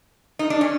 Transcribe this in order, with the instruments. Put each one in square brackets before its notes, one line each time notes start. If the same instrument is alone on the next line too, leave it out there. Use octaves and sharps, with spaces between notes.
[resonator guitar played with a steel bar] D#4
D4
C#4